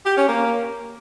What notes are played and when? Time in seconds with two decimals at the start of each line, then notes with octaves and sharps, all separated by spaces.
0.06 G4
0.16 C#4
0.27 A#3